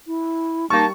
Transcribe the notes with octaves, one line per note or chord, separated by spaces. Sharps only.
E4
G3 A#3 D#4 A5 C#6